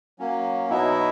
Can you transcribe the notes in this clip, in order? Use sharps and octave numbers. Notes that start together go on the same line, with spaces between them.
F#3 A#3 C#4
B2 F#3 B3 D#4 E4 E5